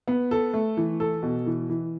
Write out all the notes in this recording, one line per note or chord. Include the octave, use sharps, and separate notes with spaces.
B3
A4
A3
E3
A4
B2
E3
E3